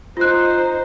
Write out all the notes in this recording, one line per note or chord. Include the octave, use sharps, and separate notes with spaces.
D#4 F4 C5 F#6